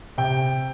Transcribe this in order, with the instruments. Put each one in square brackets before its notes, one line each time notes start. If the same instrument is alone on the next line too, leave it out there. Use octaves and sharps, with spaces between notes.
[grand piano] C3 G5